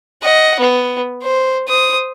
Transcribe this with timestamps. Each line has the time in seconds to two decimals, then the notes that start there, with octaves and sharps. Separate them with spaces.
0.23 D#5 F#5
0.59 B3
1.23 C5
1.68 C5 D#6